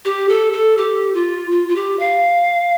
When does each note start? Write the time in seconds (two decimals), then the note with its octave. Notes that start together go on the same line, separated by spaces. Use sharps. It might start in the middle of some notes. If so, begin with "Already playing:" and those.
0.05 G4
0.29 A4
0.53 A4
0.78 G4
1.14 F4
1.51 F4
1.69 F4
1.75 G4
1.99 F5